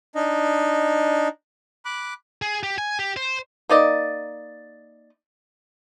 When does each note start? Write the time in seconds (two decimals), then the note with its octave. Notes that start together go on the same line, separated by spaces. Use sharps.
0.15 D4 D#4 D#5
1.85 B5 D6 F#6
2.42 G#4
2.63 G4
2.78 G#5
2.99 G4
3.17 C5
3.69 A#3 D#4 D5 D#5